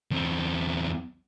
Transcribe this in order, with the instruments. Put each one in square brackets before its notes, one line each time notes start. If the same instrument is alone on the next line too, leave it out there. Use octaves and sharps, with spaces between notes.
[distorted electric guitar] E2 C4